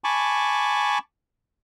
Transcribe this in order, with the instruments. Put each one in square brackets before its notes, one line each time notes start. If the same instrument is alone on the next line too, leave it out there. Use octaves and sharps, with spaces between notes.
[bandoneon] G#5 A5 B5 C#6 D6